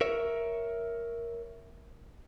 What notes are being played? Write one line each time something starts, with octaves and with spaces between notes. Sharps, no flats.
A#4 C#5 E5